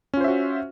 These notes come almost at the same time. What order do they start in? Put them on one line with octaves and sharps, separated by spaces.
C#4 F4 C5 E5 F#4